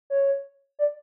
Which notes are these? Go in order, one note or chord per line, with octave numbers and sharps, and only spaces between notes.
C#5
D5